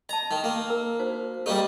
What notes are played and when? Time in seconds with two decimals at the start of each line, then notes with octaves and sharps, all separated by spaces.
0.09 D#5 A5 A#5
0.31 D#3
0.44 A#3
0.70 A#4 A#5
0.99 D#4 F#4 C5
1.46 G3 A#3 D#4 G4 G#4 A#4